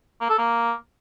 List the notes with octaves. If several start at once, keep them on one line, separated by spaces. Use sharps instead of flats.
A#3
A4
A#3